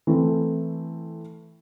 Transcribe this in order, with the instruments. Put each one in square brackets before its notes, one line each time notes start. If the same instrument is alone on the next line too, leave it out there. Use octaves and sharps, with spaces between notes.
[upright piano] E3 A3 C4